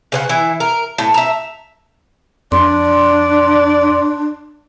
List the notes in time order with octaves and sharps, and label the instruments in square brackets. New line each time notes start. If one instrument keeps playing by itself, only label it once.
[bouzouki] C#3 C5 F#5
E3 E4
A#4
A2
E5 A#5
[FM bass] F2 [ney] D4 [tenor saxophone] D5 [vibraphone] C6